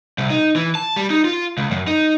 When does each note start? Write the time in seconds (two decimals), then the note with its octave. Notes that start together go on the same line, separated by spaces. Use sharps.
0.18 C2
0.30 D#4
0.56 E3
0.75 A5
0.96 G3
1.10 D#4
1.25 F4
1.57 C#2
1.71 F#2
1.87 D#4